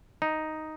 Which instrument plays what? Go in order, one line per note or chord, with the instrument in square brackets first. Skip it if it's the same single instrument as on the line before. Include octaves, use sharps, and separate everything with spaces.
[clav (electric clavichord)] D#4